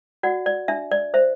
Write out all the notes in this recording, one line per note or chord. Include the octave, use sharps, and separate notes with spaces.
F#4 D5 F#5
D5
D4 E5
D5
C5 E5